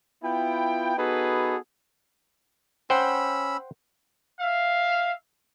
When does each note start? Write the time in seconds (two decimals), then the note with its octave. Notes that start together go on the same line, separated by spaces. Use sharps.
0.23 B3 E4 F4 G5
0.98 B3 D#4 F#4 G#4 A4 B4
2.90 C#4 C5 F#5 G5 B5 E6
4.40 E5 F5